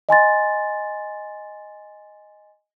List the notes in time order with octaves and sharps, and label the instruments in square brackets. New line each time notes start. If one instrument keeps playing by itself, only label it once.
[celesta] D#5 G#5 C6 A6